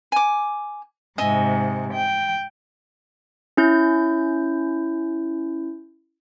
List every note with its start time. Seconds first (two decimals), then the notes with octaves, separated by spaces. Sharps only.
0.12 G#5 D6
1.18 G#2 C3 D#5 E5 G#5
1.93 G5
3.57 C#4 E4 G6